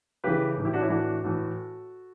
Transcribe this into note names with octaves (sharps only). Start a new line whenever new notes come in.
C#3 E3 G4 B4
A2 E3
E4 G4
D4 F#4
C#4 E4
A2 E3 D4 F#4
A2 E3 F#4 A4